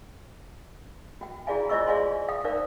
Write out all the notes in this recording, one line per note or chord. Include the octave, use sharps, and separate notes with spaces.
F#4 G5
E4 F#4 G#4 D5 F5 G#5
F4 C5 D5 D#5 C#6 E6
G#4 D5 F5 G#5 C6
F5 G5 D#6
D#4 A#4 C5 D5 F5